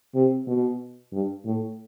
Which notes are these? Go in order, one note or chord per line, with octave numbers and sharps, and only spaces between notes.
C3
B2
G2
A2